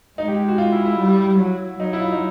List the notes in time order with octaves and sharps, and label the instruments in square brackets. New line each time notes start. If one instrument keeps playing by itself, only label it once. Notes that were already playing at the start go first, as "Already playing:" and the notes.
[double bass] G#3 [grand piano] D#4
[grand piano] G4
G4
F#4
F4
E4
E4
[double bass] G3
F#3
[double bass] F#3 [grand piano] D#4
[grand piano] E4
F4
D#4